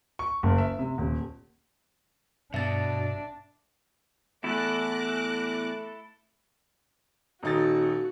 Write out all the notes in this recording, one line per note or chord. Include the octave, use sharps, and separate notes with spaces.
C#6
F#1
E5
C3
D#1
G2 B2 D4 E5 A6
E2 A3 E4 A4 D6 F#6 A#6
D#1 D#4 F#4 A6